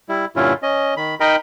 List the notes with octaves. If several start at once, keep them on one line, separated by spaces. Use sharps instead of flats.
G3 E4
G2 A#2 D3 C#4 E4 F4
C#4 D#5
D#3 B5
D#4 A#4 D#5 G5 B5